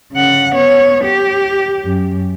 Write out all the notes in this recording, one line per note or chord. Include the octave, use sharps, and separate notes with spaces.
C#3 F#5
B3 C#5
G4
F#2